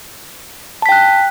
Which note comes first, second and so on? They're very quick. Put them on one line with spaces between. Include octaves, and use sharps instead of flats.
A5 B6 G5 F#6